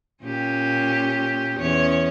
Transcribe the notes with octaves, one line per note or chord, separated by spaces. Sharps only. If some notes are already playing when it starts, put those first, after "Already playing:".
A#2 C#4 G4
E2 C#4 C#5